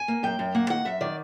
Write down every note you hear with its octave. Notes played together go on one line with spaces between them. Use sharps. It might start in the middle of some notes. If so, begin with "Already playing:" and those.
Already playing: G#5
A#3
F#2 G5
F#2
A#3 F#5
D#3 F#5
F#2 E5
D#3 D5